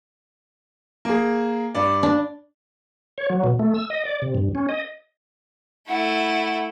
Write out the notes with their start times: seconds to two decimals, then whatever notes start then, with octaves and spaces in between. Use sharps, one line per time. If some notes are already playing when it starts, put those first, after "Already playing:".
1.05 A#3 G#4
1.75 G2 D5
2.03 D4
3.18 C#5
3.30 F#3
3.44 B2
3.59 A3
3.74 E6
3.90 D#5
4.05 D5
4.22 C3
4.35 G2
4.55 C#4
4.69 D#5
5.89 A3 E4 F#5